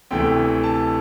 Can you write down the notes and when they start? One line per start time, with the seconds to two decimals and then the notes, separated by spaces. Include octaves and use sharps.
0.11 D2 C3 E3 A3 G5
0.63 A5